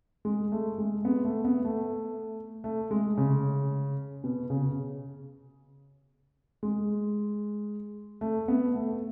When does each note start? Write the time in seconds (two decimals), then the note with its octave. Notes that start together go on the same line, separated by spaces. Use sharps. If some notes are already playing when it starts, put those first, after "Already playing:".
0.25 G#3
0.52 A3
0.78 G#3
1.05 B3
1.25 A3
1.44 B3
1.65 A3
2.64 A3
2.91 G#3
3.17 C#3
4.24 B2
4.50 C#3
6.63 G#3
8.21 A3
8.48 B3
8.75 A3